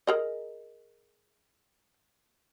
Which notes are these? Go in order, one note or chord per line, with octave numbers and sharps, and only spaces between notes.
G#4 A#4 D#5